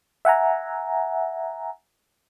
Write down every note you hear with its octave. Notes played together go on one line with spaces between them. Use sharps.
E5 F#5 G#5 A#5